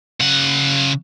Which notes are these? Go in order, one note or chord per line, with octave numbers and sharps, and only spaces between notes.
C#3 F#5